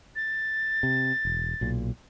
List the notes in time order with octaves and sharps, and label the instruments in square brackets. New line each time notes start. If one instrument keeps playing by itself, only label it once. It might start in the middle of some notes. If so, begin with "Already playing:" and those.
[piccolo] A6
[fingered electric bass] C3
E1
B1 A#2